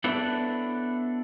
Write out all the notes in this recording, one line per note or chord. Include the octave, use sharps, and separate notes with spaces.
B3 D4 E4 A4 B4 C#5